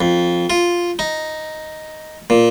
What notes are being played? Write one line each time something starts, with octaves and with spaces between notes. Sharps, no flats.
F2
F4
D#4
A#2